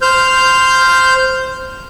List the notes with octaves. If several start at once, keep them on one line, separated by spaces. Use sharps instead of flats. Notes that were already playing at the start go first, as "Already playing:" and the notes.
C5 F6 G6